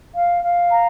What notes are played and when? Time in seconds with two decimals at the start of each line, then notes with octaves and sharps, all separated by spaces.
0.15 F5
0.43 F5
0.71 A#5